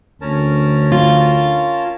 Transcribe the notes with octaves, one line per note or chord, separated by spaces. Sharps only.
D2 C#4 A#4 A5
F4